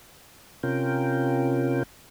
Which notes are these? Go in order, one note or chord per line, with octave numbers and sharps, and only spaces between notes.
C3 C#4 F4 A#4 G5